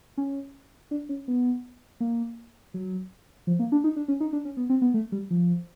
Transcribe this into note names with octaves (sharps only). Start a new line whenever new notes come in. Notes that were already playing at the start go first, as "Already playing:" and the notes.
C#4
D4
C#4
B3
A#3
F#3
F3
A#3
D4
D#4
D4
C#4
D#4
D4
C#4
B3
C4
B3
A3
G3
F3